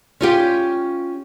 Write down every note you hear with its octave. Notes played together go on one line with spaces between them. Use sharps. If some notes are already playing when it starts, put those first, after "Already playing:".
C#4 F4 G4